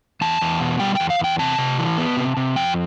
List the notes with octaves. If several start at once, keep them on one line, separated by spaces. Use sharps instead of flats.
E2 A5
E2
B2
G3 G5
E2 G5
F5
E2 G5
C3 A5
C3
E3
B3
C3
C3
F2 G5